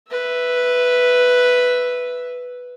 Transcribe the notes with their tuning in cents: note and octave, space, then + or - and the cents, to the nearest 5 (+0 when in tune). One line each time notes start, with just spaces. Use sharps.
B4 +0 E5 +0